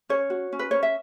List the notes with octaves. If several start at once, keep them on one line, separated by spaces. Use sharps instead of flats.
C#4 C#5
F#4
C#4
B4
C#4 C#5
E5